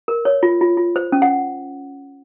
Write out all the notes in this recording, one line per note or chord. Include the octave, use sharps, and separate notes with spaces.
A#4
C#5
F4
F4
F4
C5
C#4
F#5